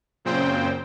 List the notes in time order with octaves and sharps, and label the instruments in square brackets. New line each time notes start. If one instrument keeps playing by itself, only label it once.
[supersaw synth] F#2 A#2 C#3 C4 C5 G5